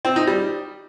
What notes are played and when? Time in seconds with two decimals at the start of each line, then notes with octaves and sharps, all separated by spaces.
0.05 C4
0.16 D#4
0.27 G3